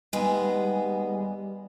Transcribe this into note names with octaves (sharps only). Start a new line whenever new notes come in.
D#2 G3 G#3 B3